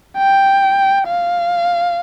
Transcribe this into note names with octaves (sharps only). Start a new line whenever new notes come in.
G5
F5